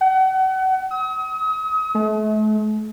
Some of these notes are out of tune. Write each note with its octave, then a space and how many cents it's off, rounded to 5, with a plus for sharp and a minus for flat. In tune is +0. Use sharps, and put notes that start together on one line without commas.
F#5 +35
D#6 +40
A3 -40